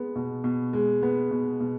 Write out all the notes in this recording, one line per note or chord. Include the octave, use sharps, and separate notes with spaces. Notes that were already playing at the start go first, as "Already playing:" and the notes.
Already playing: G#3 B3
B2
B2
G#3
B3
B2
B2